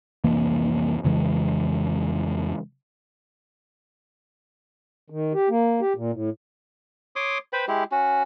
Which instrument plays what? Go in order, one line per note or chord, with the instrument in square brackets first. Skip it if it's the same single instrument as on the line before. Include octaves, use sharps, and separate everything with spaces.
[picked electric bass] C2 F2 E3 A#3
F2 C#3 E3 G#3
[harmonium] D#3
G4
A#3
G4
A#2
A2
[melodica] C#5 C6 D6 D#6
B4 C5 G5 B5
G#3 E4 G4
C#4 F#4